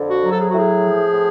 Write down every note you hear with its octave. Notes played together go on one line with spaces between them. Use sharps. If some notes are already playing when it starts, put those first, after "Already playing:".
Already playing: F2 D3
F#4
F#3
A4
G#4
F#4
A2 G#4
F3
A2